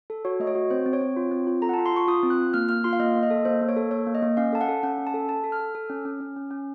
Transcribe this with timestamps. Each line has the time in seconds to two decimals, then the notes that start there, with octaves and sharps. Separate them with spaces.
0.10 A4
0.25 F#4 C#5
0.40 A3 D#5
0.47 C#5
0.55 F#4
0.70 C4 C5
0.86 C4
0.93 C#5
1.01 C4
1.16 F4
1.31 C4
1.47 F4
1.62 A4 A#5
1.69 F#5
1.74 F4 A5
1.86 C6
1.93 F4 C#6
2.08 F4 D#6
2.23 C4
2.30 F#6
2.38 F4
2.54 A#3 F6
2.69 A#3 F6
2.84 F4 C6
2.93 F5
3.00 A#3 D#5
3.15 A#3
3.23 D#5
3.30 A4
3.45 A#3 C5
3.61 A#3
3.69 C#5
3.76 A4
3.91 A#3 C#5
4.07 A#3
4.15 D#5
4.22 A#3
4.37 C#4 F5
4.53 A4 A5
4.61 F#5
4.68 A4
4.83 C#4 F#5
4.98 C#4
5.07 A5
5.14 A4
5.28 A4 A5
5.44 A4
5.52 F6
5.60 A4
5.75 A4
5.90 C#4
6.05 C#4
6.20 C#4
6.36 C#4
6.51 C#4